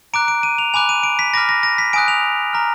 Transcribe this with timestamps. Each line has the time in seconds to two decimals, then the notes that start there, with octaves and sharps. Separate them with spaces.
0.14 A#5 D6 F#6 D7
0.28 D7
0.43 D#7
0.58 F7
0.74 G#5 B5 D6 F#6 F7
0.89 D#7
1.03 D7
1.19 B6
1.34 B5 D6 F6 A#6
1.49 A#6
1.63 A#6
1.78 B6
1.93 G#5 D#6 F#6 D7
2.08 F7
2.53 A#5 F6